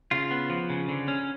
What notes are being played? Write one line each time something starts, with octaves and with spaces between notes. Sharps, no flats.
C#3 F4
B3
F3
C#3
D3
C#4